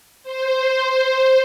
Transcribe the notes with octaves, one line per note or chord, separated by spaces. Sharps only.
C5